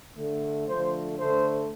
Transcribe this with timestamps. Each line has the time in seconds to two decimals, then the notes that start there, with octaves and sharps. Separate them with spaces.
0.17 D3 A3
0.67 D3 F3 A3 C5
1.17 D3 A3 C5